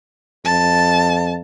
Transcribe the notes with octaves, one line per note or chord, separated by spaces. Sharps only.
F2 A5